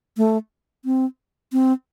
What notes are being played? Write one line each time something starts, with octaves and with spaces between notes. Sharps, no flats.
A3
C4
C4